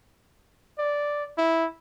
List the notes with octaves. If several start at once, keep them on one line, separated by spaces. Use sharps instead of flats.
D5
E4